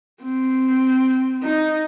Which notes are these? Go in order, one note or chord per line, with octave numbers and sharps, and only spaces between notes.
C4
D#4